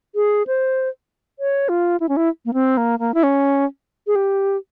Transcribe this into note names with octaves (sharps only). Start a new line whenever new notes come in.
G#4
C5
C#5
F4
E4
C#4
E4
A#3
C4
A#3
A#3
E4
C#4
G#4
G4